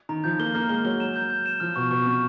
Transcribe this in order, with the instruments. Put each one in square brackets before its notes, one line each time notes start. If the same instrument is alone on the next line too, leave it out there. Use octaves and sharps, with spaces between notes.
[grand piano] D#3 [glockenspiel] A#5
[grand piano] F3 [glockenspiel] G6
[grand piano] A#3 [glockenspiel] G7
[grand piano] A#3 [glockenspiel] F6
[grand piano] G#3 [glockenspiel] G7
[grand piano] F#3 [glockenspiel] G7
[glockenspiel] E7
G6
G6
E7
[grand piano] F3 [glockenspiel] F6
[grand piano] B2 [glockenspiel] C#6
[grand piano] B2 [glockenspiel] C#6
[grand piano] C3 [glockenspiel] F6